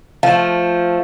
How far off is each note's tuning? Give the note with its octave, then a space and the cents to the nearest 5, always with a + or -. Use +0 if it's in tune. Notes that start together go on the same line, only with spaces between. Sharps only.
F3 +0 A3 +0